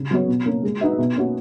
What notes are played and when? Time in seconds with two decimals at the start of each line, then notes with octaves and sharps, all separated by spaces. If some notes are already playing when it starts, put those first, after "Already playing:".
Already playing: C#3
0.11 F#3 B3 F#4 C#5
0.28 B2
0.46 A#3 C#4
0.63 G#3
0.81 D#4 F#4 B4 E5
0.98 B2
1.16 A#3 C#4 F#4